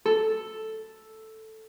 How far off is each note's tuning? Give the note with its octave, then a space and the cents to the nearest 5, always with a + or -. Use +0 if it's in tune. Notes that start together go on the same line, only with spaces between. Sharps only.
A4 +0